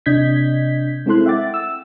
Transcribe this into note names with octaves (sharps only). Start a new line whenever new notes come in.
C3 D4 D#5 G6 G#6 B6
G#3 C4 E4 A4 C6 F#6
E5 F#5 G5 D6 A6
E6